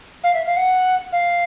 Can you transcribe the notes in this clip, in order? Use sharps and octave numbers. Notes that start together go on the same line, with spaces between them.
F5
E5
F5
F#5
F5